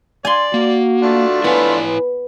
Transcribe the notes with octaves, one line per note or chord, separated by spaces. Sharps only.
D5 G#5 C6
A#3 F#4
A3 D4 F4
B3 E4 B4 C#5 G#5